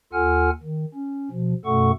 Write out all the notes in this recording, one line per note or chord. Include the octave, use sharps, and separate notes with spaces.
D#2 F4 A4 F#5 G#5 F6
D#3
C#4
B2 F3
F#2 B2 A3 A4 F#5 C#6